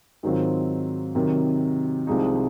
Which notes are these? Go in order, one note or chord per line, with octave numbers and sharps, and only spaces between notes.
G#2 D#3 F#3 C4 F4
C3 D#3 F#3
C2 C3 F3 G#3 D#4